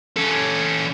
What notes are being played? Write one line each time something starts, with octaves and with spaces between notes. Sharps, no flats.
C#4 A4